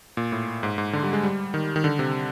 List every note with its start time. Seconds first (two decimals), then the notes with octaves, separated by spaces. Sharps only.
0.17 A#2
0.32 A2
0.63 G#2
0.78 G#2
0.93 D3
1.03 G3
1.13 G#3
1.23 G3
1.54 D#3
1.76 D#3
1.84 D3
1.99 C3